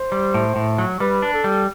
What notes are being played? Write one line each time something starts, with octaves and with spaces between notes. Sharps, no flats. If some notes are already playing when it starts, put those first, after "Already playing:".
Already playing: C5
G3
A2
A2
F#3
G3 B4
D4
A4
G3